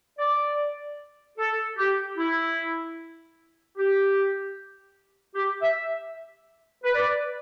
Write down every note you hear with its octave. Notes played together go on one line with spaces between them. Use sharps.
D5
A4
G4
E4
G4
G4
E5
B4
D5